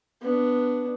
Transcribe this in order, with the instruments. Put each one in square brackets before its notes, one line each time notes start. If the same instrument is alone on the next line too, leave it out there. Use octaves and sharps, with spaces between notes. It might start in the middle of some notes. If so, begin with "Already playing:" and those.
[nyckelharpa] B3 D4